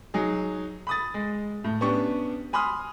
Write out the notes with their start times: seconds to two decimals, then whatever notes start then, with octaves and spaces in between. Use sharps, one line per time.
0.14 F#3 D#4 G#4
0.87 B5 D#6 A6
1.14 G#3
1.64 A2
1.81 B3 C#4 D4 G4 C#6
2.53 G#5 B5 C6 D#6 F6